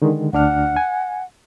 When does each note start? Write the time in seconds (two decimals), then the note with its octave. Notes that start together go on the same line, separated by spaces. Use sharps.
0.02 D3 D#3 G#3
0.33 D2 D4 F#5 F6
0.76 G#5